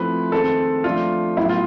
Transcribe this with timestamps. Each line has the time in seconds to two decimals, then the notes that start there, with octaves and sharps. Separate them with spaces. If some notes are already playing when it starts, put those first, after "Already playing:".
Already playing: F3 A3 C4 E4 B4
0.32 D#3 G#3 C4 A4
0.84 F3 A3 D4 F4
1.37 A2 F#3 B3 E4
1.49 F4